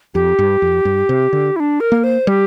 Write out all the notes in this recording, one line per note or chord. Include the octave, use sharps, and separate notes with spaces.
F2 G4
G2
F2
G2
C3
D3
E4
D4
A#4
A#3
C5
G3 G4